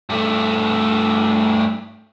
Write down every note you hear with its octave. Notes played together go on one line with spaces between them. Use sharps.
G2 A3